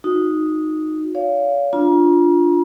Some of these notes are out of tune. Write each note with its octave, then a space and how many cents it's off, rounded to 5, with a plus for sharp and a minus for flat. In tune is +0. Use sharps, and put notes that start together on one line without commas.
D#4 +0 F#4 -30
C#5 +40 F5 +0
D4 +0 F4 +0 A#5 +35